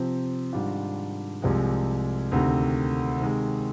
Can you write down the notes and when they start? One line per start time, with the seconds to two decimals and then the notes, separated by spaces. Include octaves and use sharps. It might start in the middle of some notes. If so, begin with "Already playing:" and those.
Already playing: C3 F3 C4
0.53 G#2 D#3 G3 D4 F4
1.42 C2 C3 F3 G#3
2.32 D2 C3 D#3
3.21 C3 D#3 G#3